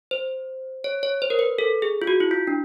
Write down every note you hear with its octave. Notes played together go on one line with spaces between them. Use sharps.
C5
C#5
C#5
C5
A#4
B4
A4
G#4
F4
F#4
E4
F4
D4